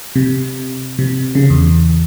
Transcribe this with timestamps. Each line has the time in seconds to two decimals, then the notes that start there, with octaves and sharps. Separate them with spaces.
0.16 C3
0.99 C3
1.35 C#3
1.50 E2